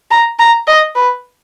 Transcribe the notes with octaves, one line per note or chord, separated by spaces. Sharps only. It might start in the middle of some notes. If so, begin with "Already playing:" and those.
A#5
A#5
D#5
B4